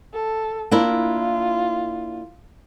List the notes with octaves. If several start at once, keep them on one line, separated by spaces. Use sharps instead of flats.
A4
A#3 D4 E4 F4